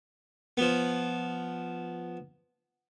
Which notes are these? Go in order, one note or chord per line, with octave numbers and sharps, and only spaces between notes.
F3 B3